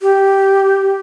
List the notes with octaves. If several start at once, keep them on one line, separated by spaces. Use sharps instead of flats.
G4